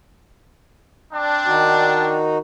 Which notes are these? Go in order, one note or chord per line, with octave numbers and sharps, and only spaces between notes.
C4 D4
D#3 D#4 F#4